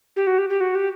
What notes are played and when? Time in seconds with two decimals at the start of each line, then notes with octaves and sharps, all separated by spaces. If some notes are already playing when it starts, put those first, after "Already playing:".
0.16 G4
0.27 F#4
0.38 G4
0.49 G4
0.61 F#4
0.75 G4